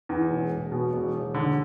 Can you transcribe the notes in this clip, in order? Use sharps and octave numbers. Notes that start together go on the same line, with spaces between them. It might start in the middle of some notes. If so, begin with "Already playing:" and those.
E2
E1
E1
B2
E1
E1
D3